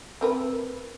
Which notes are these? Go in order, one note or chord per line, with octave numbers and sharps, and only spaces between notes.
C4 A#4 B4